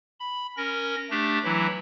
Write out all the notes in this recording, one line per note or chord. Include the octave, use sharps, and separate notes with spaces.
B5
C#4 A#4 A#6
A3 D4 G4
E3 F#3 E4